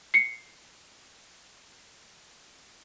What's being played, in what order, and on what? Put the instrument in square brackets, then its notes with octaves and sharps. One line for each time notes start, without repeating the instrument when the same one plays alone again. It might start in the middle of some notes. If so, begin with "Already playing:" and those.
[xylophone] C7 C#7